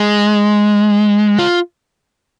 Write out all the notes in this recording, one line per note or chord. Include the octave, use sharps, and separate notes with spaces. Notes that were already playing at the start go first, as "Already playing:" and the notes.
Already playing: G#3
F4